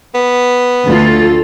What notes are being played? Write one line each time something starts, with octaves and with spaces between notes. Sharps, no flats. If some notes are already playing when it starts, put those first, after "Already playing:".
B3
D2 F4 A4